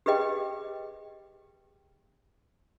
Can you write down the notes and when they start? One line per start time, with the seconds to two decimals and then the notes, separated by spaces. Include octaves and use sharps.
0.06 G4 G#4 B4 D#5 G5